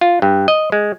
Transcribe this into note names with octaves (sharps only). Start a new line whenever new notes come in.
F4
G2
D#5
G#3